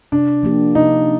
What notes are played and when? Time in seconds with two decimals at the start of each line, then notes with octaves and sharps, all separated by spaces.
0.12 C3 D4
0.43 F3 A#3 D4 G4
0.75 C3 D#4